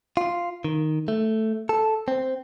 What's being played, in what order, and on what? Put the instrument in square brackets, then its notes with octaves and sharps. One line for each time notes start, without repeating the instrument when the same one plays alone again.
[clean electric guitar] F4
D#3
A3
A4
C4